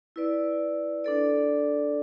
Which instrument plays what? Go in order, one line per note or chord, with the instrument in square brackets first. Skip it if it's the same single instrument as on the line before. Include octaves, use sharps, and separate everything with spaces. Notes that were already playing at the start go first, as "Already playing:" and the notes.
[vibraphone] E4 B4 D5
D4 A4 D5